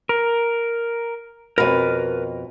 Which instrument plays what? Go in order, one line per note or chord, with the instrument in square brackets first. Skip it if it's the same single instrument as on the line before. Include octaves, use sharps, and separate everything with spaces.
[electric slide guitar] A#4
[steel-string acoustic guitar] F2 B2 [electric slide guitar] A#4 B4